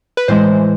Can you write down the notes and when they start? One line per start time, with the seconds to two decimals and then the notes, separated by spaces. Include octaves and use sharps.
0.17 B4
0.28 A2 E3 G#3 C5